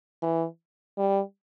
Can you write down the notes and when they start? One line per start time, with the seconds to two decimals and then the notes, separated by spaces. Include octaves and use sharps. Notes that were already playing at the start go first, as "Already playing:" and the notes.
0.22 E3
0.98 G3